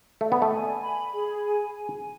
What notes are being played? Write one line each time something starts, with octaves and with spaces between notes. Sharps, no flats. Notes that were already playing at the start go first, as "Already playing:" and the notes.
A3 D5
B3
A3
G#5
B5
G#4
G#5
G#5